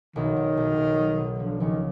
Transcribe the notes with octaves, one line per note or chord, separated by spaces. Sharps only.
B1 D#3
B1
B1
B1
F#3
B2
D3 F3
C#2 D#3